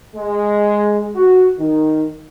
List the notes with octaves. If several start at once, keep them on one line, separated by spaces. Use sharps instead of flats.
G#3
F#4
D#3